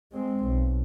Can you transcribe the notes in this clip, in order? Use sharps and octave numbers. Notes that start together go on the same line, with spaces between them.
G#3 C4
B1